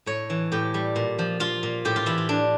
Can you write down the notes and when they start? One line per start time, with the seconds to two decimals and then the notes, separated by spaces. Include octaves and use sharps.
0.06 A2 C#5
0.30 E3
0.52 A2 G4
0.74 G3
0.96 A#2
1.19 F3
1.40 F3 F4
1.63 A#2
1.85 A2 G4
1.96 F4
2.06 E3 E4
2.18 F4
2.29 A2 D4